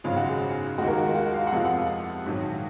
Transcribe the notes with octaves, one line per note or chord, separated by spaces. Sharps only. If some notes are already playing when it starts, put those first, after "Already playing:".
G#1 F#2 C#3 F4
F#4
G#4
D#2 D#3 G#3 F#4
A#4
F#4
F4
F#4
F5
F#5
F2 C3 F3 G#3 F5
F#5
F5
A#1 G#2 D#3 F#3